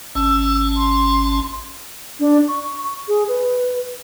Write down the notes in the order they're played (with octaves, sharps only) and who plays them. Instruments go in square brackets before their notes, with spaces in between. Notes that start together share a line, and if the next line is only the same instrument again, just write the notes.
[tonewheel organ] G#1 C#4 A5 [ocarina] E6
[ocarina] C6
[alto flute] D4
C#6
G#4
B4